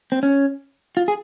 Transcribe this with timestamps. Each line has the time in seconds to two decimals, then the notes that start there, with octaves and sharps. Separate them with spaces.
0.12 C4
0.23 C#4
0.97 F4
1.08 G#4